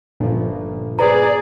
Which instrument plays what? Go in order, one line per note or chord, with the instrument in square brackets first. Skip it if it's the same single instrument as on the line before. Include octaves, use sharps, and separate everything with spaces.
[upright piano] G1 [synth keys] A#2 F3
[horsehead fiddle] G#4 D5 [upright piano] B4 C5 [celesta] A#5